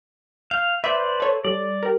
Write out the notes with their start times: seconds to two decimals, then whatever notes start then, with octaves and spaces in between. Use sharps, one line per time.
0.51 F5 G6
0.84 B4 C5 D5 E5 G6
1.20 A4 C#5
1.45 G3 D5
1.83 G4 A#4